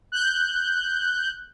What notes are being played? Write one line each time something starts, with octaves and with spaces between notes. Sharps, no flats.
F#6 G6